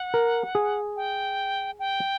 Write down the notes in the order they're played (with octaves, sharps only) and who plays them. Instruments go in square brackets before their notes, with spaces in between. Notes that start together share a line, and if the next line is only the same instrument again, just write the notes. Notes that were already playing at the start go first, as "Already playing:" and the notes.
Already playing: [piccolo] F#5
[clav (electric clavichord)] A#4
G#4
[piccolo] G5
G5